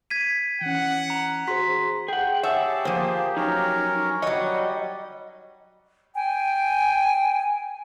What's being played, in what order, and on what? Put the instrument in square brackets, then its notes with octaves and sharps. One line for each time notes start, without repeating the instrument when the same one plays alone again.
[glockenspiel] G#6 B6 D#7
[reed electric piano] E3 C#4 [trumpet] F#5
[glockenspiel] A#5
[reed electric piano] F#4 G#4 C5 [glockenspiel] C6 B6
[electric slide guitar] G#4 F#5 [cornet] G5
[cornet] G4 [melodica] G#4 A5 [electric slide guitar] C#5 F#5 [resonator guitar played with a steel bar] E5
[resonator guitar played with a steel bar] F3 A#3 [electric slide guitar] C5
[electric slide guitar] F#3 D#4 [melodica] C#4 A#4 C#5
[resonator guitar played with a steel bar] F#3 C#5 [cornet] G3 [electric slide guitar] D#5 [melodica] F#5
[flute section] G5 G#5